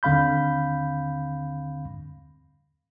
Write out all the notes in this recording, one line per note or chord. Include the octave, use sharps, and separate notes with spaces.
D#2 D3 C4 F5 B5 G6